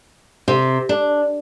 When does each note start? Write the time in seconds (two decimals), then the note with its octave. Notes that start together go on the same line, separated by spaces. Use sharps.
0.48 C3
0.89 D4